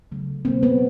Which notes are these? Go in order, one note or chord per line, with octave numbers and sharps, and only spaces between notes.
C#3 F#3 A3
B2 F#3 A#3 C4
B3